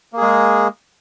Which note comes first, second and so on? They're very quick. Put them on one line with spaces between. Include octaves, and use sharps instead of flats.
A#3 G#4 G#3